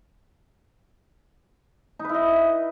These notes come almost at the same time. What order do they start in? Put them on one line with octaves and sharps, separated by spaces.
D#4 B4 E4 D#5